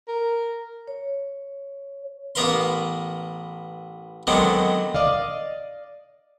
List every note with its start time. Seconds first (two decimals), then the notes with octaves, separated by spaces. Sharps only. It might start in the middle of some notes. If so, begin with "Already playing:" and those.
0.08 A#4
0.87 C#5
2.35 A1 B3 A#4 B4 F5 C6
4.27 D3 D#3 F#3 G#3 B3 C4
4.95 D5 D#5 F5